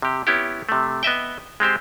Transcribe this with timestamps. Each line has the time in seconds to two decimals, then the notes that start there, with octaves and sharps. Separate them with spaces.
0.02 C3 G4
0.27 B3 C#4 E4 G4
0.69 C3 A3
1.03 B3 D#5 E5 G5
1.60 G#3 C4 G4 C5